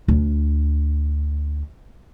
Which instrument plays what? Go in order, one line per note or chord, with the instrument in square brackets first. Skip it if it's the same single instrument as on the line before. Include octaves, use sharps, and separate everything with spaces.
[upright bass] D2 D4